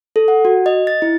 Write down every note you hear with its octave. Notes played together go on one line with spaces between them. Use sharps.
A4
F#5
F#4
D#5
A6
E4